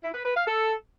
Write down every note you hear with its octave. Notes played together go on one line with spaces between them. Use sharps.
E4
B4
B4
F5
A4